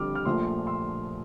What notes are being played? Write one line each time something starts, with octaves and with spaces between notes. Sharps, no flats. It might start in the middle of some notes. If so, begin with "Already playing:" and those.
Already playing: F2 D3 G3 D6 F6
F6
A#1 A#2 F3 A3 C6 E6
C6 E6